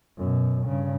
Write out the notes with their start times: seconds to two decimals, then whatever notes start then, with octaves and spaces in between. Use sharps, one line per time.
0.18 F#2 B2
0.67 G2 C#3